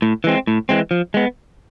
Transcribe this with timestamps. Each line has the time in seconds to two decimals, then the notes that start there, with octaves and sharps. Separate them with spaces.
0.02 A2
0.24 E3 G#3 C4
0.47 A2
0.69 E3 G#3 C4
0.91 F3
1.14 G#3 B3